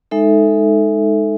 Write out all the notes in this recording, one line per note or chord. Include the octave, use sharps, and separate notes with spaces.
G#3 D#4 A4 E5